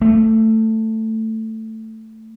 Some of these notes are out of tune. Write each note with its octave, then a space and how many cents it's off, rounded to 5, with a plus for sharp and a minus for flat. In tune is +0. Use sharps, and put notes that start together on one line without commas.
A3 +10